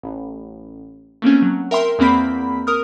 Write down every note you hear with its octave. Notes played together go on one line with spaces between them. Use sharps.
A1
A3 A#3 C4 C#4
F#3
A#4 E5 G5 C6
E2 A#3 C4 B5 B6
A#4 D#6 F6